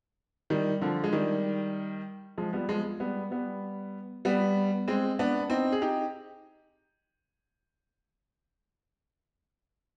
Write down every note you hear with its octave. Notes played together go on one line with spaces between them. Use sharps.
D#3 G3
D3 F3
G#3
D#3 G3
F3 G#3
G3 B3
F3 G#3
G3 B3
G3 B3
G3 B3
G#3 C4
B3 D4
C4 D#4
G#4
D#4 G4